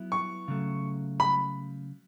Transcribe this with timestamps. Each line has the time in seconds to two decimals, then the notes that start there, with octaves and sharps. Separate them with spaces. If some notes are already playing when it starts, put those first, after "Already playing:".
Already playing: F#3 B3 E4
0.12 C#6
0.48 C#3 F#3 A3
1.20 B5